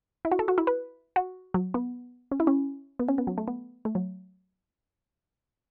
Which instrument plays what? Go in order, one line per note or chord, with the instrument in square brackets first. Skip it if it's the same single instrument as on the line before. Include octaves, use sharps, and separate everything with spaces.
[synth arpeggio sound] E4
F#4
A4
F#4
E4
B4
F#4
F#3
B3
C#4
E4
C#4
B3
C#4
B3
F#3
A3
B3
A3
F#3